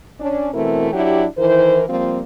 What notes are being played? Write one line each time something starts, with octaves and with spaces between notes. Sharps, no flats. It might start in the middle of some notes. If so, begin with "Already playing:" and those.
C#4 D4
B2 E3 A3 C4 E4 A#4
F#3 D4 E4 G4
D#3 E3 E4 A#4 C5
F3 G3 A#3 C4 F4